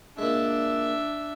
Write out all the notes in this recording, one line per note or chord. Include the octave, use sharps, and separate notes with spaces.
A#2 G#3 D4 E5